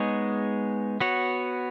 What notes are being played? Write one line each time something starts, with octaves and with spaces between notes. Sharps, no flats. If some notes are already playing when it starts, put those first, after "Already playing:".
Already playing: G#3 B3 D#4 G#4 C#5
B3 F#4 C#5